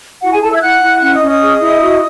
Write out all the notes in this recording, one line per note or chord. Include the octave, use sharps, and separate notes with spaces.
E4 F#4 F#5
G#4 G#5
E4 A4 A5
E5 E6
G#6
E4 F#5 F#6
E4
C#4 F#5 F#6
D#5 D#6
C#4
D#5 D#6
G#4
E4
F#4